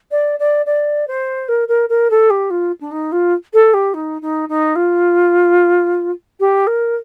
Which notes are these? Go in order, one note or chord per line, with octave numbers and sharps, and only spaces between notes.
D5
D5
D5
C5
A#4
A#4
A#4
A4
G4
F4
D4
D#4
F4
A4
G4
D#4
D#4
D#4
F4
G4
A#4